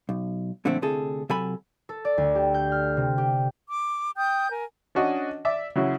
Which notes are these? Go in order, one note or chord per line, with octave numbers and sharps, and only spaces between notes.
B1
A#2 D3 F3 A3 C4
D2 C3 E4 G#4 A4
C3 F#3 A4 G#5 B5
A4
D5
D2
G4
G6
F6
C3
G4
D6
G5 D#6 G6
A#4 G#5
C#4 D4 F#4 D#5
D5 E5 D6
C#3 F#3 E4 F#4